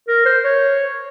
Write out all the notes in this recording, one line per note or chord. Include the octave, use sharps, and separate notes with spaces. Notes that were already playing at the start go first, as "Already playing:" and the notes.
A#4
C5
C#5